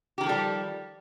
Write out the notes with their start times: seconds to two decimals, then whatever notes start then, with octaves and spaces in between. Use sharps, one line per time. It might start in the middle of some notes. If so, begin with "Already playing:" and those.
0.18 G4
0.21 D#3
0.24 F3
0.26 A4
0.29 G3